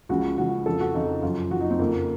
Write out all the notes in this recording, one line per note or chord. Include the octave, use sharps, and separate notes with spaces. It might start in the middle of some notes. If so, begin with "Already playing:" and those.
C#2 C#3 F3 F#4
C#2 C#3 F3 F#4
F2 C#3 F3 A4
F#4
F2 C#3 F3 D#4
F#2 F3 F4
F#2 F3 F#4
D#4
C4
F2 C#3 F3 A#3